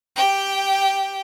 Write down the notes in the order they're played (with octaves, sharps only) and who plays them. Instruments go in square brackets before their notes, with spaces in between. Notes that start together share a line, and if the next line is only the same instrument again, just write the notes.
[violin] G4 G5